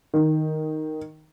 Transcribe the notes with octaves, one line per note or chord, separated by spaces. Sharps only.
D#3